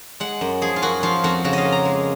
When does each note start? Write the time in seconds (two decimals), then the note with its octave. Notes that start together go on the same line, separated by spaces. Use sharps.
0.20 G#3 F#5
0.41 F#2
0.61 F3 G#4
0.76 F4
0.82 F#2 F#4
1.03 F3 F4
1.24 F2 F#4
1.44 C#3 F#4
1.53 D#5 F5
1.65 A#3
1.72 A#5
1.85 G#3